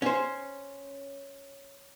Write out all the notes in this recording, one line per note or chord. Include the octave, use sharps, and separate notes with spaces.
C#4 C5